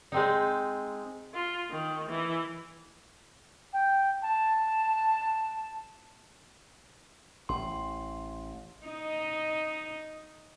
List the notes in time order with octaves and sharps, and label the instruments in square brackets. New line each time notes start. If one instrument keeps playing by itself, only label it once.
[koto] G#3 C4 D#4
[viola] F4
D#3
E3
[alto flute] G5
A5
[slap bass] A1 [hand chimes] C6
[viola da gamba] D#4 D#5